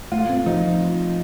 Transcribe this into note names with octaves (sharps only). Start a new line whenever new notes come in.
A3 F4
C4
F3 D#4